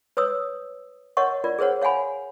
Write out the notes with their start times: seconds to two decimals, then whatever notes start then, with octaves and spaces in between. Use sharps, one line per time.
0.17 B4 C#5 D#6 E6
1.17 A#4 C#5 D#5 F#5 C#6
1.44 F4 A#4 D5
1.59 G#4 A#4 C5 C#5 F#5
1.81 C#5 F5 F#5 G#5 B5